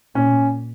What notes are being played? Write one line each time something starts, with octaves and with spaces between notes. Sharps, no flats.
A#2 C#4